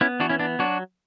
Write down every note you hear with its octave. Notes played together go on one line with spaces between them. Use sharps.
B3 C#4 E4
E3 D4 F#4
C#4 E4
B3 D4
F#3 D4 F#4